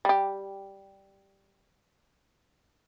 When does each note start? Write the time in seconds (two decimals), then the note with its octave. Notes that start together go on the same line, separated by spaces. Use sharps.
0.05 G3 G4